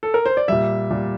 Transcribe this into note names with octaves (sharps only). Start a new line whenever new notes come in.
A4
A#4
C5
D5
A#2 G3 E5
A#2 G3